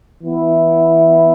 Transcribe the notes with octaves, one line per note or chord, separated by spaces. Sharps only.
E3 B3 E4